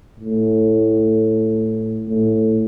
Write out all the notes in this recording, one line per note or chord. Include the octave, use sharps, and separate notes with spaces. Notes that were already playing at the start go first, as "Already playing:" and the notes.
A2
A2